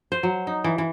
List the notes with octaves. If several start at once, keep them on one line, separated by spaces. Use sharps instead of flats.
C5
F#3
D#4
E3
E3